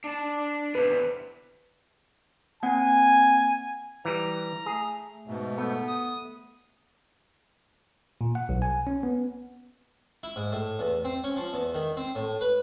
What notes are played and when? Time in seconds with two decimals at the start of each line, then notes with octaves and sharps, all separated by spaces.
0.04 D4 A5
0.75 E2 C3 B4
2.63 A#3 C4 F#5 G#5
4.05 E3 G3 A#5
4.66 A3 G#4
5.27 G#2 B2 A3
5.57 A3 B3
5.88 D#6
8.21 A#2
8.35 F#5
8.49 B1
8.62 G#5
8.87 C#4
9.03 B3
10.23 E4
10.36 G#2
10.52 A2
10.79 E2
11.04 C4
11.24 C#4
11.36 F3
11.53 E2
11.75 D#3
11.97 C4
12.15 A2
12.41 B4